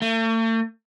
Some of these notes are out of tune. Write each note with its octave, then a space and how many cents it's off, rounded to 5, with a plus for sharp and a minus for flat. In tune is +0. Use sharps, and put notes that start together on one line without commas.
A3 +45